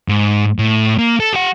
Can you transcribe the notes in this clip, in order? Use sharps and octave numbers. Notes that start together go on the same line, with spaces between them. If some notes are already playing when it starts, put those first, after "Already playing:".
G#2
A2
A#3
A4
G4 F#5